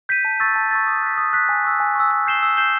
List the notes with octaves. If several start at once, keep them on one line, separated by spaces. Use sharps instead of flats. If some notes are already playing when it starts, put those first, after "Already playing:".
G6 B6 D#7
A5
C#6 E6 A6
A5
C#6 E6 A6
D#6
F#6 B6
D#6
F#6 B6
G#5
C#6 E6
G#5
C#6 E6
E6
G6 C7 E7 G7
E6
G6 C7 E7 G7